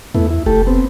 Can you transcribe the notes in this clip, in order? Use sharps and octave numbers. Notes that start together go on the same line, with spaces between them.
E2 A3 B3 E4
E4
F1 A3 G4 A4
B3 C4